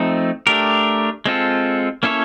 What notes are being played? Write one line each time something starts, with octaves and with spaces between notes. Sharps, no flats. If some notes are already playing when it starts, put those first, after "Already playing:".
Already playing: F3 A3 C4 D#4
A3 D4 G4 A#4
G#3 C4 F4 A4
A#3 C#4 E4 A4 C#5